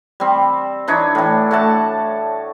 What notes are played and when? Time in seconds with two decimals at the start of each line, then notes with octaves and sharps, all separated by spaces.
0.20 G3 C4
0.88 E3 D4 D#4 C#5
1.15 A2 E3
1.51 A3 F#4 A5